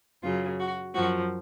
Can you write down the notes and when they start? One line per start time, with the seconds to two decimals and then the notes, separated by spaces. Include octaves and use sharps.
0.22 F#2 C#3 F#3 F4
0.59 F#4
0.94 F#2 F3 F#4